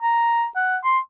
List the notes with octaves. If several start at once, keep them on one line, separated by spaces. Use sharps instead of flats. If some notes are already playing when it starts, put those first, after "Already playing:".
A#5
F#5
C6